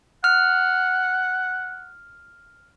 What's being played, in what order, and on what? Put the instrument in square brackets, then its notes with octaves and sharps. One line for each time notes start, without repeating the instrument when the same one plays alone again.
[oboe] F#5 [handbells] F6